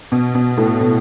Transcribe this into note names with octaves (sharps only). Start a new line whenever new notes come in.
B2
B2
A2
B2